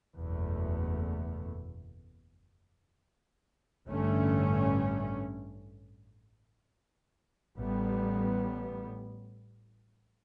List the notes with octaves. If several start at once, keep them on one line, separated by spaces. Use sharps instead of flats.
F#1 E2 B2 A3
A1 G2 D3 A3 C#4
A1 A2 G3 B3